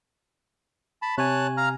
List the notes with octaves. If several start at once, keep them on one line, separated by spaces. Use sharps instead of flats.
A5 B5
C3 C#5 G#5 A5 F#6
F5 A#5 F6